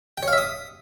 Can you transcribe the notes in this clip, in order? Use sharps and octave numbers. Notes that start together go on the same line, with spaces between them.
G5
C#5
F5
E5
D#6